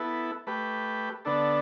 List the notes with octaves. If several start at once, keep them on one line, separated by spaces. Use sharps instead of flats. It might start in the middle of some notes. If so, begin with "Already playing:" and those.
Already playing: B3 E4 A4
A3 G4 B4
D3 B3 D4 A4